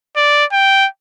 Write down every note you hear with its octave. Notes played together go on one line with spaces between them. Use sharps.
D5
G5